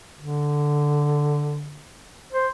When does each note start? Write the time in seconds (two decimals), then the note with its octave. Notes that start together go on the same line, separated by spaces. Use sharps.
0.18 D3
2.33 C5